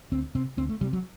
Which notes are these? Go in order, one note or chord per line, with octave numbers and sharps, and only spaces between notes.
D2 C4
C3 C4
D2 C4
A3
C3 G3
F#3